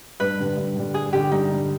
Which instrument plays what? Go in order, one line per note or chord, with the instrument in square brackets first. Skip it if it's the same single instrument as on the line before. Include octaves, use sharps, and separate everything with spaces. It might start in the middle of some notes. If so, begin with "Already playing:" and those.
[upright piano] G2 [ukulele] B4
[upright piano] D3 G3
G2
D3 G3
[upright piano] G2 [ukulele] G#4
[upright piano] D3 G3 [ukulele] G4
[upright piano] G2 [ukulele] D#4
[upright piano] D3 G3